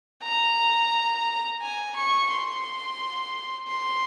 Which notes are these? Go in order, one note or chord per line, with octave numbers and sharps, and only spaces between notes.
A#5
G#5
C#6
C6
C6